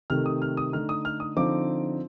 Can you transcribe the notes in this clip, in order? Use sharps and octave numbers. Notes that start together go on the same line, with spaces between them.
C3 D#3 A3 F6
D#6
F6
D#6
D3 A3 D#4 F6
D#6
F6
D#6
D3 F3 C4 D#4 D6